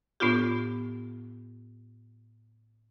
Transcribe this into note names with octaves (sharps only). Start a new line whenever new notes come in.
A2 B3 D4 F4 G4